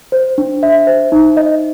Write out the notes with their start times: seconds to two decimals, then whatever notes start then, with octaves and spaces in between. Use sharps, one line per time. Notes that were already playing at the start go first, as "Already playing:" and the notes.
0.12 C5
0.38 D4
0.63 E5
0.87 C5
1.12 D#4
1.37 D#5